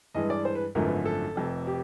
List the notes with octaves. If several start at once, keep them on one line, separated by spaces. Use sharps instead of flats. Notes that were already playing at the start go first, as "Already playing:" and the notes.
G2 E3 G#3 D#5
D5
C5
B4
G#1 F#2 D3 F3 A3 A#4
B4
A4
F1 F2 C3
G4